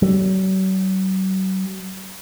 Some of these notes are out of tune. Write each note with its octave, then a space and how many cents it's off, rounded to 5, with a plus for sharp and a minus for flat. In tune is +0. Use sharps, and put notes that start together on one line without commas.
F#3 +40